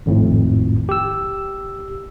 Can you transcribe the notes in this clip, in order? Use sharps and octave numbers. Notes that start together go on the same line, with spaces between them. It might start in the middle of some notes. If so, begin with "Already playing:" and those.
G#1 F2 A2
G4 E6